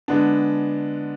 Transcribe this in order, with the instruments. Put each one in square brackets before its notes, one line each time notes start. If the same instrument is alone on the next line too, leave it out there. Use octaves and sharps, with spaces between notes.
[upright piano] D3 G#3 B3 D4